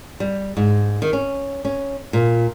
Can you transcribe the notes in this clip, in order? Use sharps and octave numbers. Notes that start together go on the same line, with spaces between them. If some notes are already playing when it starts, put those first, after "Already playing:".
G3
G#2
D#3
C#4
C#4
A#2